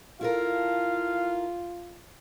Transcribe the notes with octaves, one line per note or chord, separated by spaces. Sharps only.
E4 F4 A4 A#4 F5